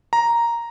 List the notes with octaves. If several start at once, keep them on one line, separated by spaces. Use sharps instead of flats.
A#5